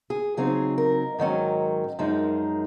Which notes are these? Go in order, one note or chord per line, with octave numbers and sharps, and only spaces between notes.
G#4
C#3 F#3 C4 D#4 G#4
A#4
G#2 D#3 F#3 C#4
F#2 F3 G#3 D#4